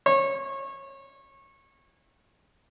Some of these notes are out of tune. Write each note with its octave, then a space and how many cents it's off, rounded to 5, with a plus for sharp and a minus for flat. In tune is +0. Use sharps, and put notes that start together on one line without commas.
C#5 -25